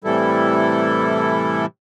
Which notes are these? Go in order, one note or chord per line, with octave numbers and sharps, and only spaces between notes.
A2 C3 E3 G3 E4 A4